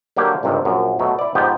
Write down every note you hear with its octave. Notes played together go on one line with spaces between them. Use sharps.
D3 F#3 A#3 G4 C#5 F5
G#1 C#2 G2 C3 D#3
A#1 F#2
B2 F#3 A3
E4 D5
G#2 F3 B3 G4 G5